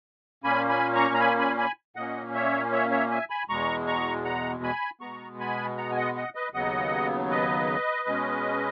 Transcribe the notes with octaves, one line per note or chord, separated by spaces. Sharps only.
A#2 A#3 C#4 G#5 B5
G#5 B5
A#5 C#6
A#5
G#5 B5
G#5 B5
G#5 B5
A#2 A#3 C#4 D#5 F#5
C#5 E5
C#5 E5
C#5 E5
E5 G#5
G#5 B5
E2 B2 G#3 A#5 C#6
A#5 C#6
F#5 A#5
G#5 B5
B2 G#3 B3 A#5 C#6
G#5 B5
F#5 A#5
G#5
D#5 F#5
D#5 F#5
B4 D#5
D#2 C#3 F#3 B3 D#5 F#5
B4 D#5
B2 G#3 C#4